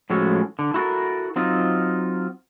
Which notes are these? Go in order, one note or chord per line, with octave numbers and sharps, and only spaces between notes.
A2 F3 G#3 C#4 F#4 A4
D3
E4 F#4 A4 A#4
F#3 C4 D#4 F4